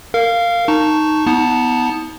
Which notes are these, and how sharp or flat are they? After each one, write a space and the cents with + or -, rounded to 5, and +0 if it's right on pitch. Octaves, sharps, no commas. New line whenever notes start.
A#4 -25 F5 -5
D#4 -5 A5 +0 C#6 +0
B3 +0 D#4 +40 A5 +0